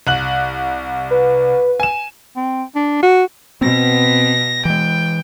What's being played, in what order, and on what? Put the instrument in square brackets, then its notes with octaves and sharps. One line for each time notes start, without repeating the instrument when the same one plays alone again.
[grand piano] C2 F#6 F#7
[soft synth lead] B4
[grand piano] G#5 E7
[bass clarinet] C4
D4
F#4
[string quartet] B2 B3 A#6 [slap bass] C4
[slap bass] E3 G#3 [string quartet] G5